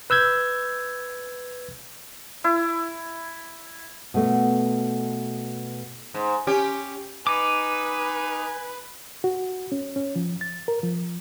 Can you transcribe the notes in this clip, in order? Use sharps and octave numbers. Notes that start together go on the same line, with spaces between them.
B4 E6 G6 G#6
E4
B2 A3
G#2
C#4 G4
D#4 B4 G#5 D6
F#4
C#4
C#4
F3
A6
A#4
F3